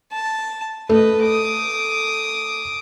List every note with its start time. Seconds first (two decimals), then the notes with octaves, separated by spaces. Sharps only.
0.12 A5
0.89 A3 B4 D#5
1.23 D6 D#6